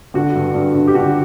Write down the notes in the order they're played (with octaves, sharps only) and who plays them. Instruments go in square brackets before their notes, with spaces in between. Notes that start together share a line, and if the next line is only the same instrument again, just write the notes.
[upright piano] D3 F#4
G2
G2
D3
G4
D3 F#4